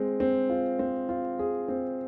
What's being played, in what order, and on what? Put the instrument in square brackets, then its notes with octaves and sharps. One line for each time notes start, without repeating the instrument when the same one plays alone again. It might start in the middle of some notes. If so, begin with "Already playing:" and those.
Already playing: [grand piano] G#3 C4
C4
F4
C4
F4
G#4
C4